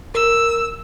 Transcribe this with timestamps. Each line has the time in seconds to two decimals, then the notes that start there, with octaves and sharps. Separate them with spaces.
0.15 A#4 E6